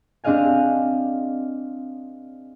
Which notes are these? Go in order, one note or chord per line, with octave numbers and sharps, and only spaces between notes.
C4 D4 G#4 D#5 F5 G#5